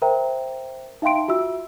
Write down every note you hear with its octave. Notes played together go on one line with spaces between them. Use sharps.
A#4 C5 E5 G5 A#5
D#4 E5 F5 G5 C6 D7
F4 F#4 E5 E6